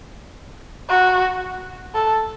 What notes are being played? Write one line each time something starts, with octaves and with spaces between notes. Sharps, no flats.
F#4
A4